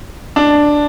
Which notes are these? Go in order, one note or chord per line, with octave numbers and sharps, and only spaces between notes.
D4